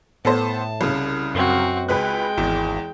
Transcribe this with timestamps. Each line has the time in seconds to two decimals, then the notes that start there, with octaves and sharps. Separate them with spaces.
0.25 A2 B3 A4 C5 A5
0.81 C2 C#3
1.35 F#2 C4 F#4
1.89 C#2 G#3 B4 G5 F#6
2.38 G#1 E2